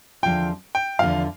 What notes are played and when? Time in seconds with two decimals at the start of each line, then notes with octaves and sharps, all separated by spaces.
0.23 E2 D3 F3 C4 F4 G5
0.75 G5
0.99 E2 D3 F3 C4 F4 F5